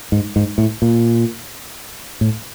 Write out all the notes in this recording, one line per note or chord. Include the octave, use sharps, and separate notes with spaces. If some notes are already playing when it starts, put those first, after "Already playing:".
G#2
G#2
A2
A#2
A2